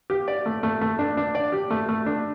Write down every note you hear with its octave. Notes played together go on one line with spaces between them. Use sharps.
G4
D5
A3
A3
A3
D4
D4
D5
G4
A3
A3
D4